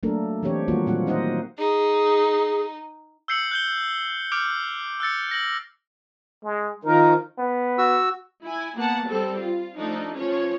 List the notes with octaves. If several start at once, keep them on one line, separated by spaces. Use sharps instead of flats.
F#3 A3 A#3 D4 A4 A#4
E3 C4 D4 G4 C#5
D#3 G3 A#3 F4 F#4
A#2 F#3 A#3 C4 F4 F#5
C4 D#4 C5 D#5 F#5
D#4 G#4
E6 G6 C7 C#7 F#7
F#6 G6 G7
D6 F6 G6 D7
E6 F#6 A6 C#7
A#6 F#7
G#3
D#3 F3 D#4 A#4
B3
F#4 E6
E4 G#5
A#3 B3 F#5 A5
G3 C4 A4
F4
F3 A3 D4 D#4
F3 C#4 C#5